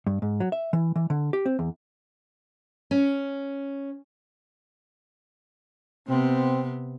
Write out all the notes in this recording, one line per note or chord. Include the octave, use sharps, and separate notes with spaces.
G2
G#2
F#3
E5
E3
E3
D3
G4
C4
E2
C#4
C3 B3 C4